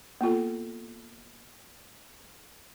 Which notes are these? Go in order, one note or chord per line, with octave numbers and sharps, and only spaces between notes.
A#3 B3 F4 A4